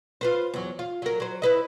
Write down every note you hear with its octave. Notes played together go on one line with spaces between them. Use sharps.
F4 B4 C5
E2 F#3
F4
F#3 A#4
F#3 C5
E4 B4 D#5